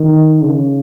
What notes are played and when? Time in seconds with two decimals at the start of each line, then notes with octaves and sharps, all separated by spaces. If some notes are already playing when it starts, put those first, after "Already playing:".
Already playing: D#3
0.42 C#3